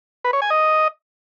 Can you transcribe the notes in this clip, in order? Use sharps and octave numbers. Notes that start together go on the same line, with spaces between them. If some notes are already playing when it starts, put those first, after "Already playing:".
B4
C#5
G#5
D#5